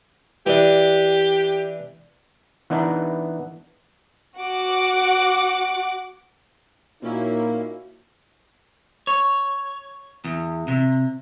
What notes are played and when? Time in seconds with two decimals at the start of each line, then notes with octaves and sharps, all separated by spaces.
0.46 E3 D4 G4
2.70 E3 B3 D4 D#4
4.37 F#4 F#5 D6
7.03 A#2 A#3 C#4 D#4 E4 F#4
9.07 C#5
10.24 E2
10.68 C3